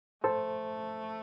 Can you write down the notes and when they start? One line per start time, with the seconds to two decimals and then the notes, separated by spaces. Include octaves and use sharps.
0.24 A3 A4 C5